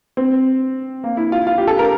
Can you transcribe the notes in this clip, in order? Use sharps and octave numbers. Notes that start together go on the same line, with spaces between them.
C4
A#3
E4
F4
F4
G4
A4
A#4